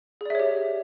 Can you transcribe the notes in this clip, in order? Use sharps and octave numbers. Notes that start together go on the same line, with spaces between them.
G4 G#4 C#5 D5 E5